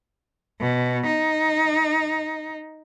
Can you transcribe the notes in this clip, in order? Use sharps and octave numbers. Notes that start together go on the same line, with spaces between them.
B2
D#4